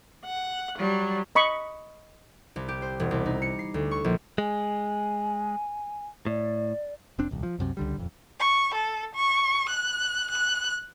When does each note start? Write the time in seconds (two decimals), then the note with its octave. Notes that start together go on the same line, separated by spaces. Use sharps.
0.24 F#5
0.78 F#3 G3
1.35 D#5 B5 C#6
2.56 C2
2.68 G4
2.82 C5
3.00 E1
3.11 C2
3.26 D#4
3.42 C#7
3.59 C7
3.74 D2
3.91 C#6
4.04 A#1
4.38 G#3 G#5
6.26 A2 D5
7.19 F1 C4 D4
7.31 D#1 C2
7.43 F3
7.59 C2 F#2 C3
7.77 C#2 D3 G3
7.96 D#1 F2
8.40 C#6
8.75 A4
9.15 C#6
9.69 F#6
10.31 F#6